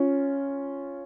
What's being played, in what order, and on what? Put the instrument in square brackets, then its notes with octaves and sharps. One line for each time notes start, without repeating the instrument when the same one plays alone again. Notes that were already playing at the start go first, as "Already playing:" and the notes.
Already playing: [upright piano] C#4 F4